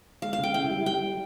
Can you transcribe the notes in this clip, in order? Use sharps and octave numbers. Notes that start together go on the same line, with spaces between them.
G#3 F5
F5
C#3
G5
E4 G5
G3
G3 G5